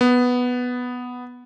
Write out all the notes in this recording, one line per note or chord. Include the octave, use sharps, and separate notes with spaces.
B3